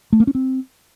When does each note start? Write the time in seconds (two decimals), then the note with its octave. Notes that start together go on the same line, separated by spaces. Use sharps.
0.13 A3
0.20 A#3
0.27 C#4
0.35 C4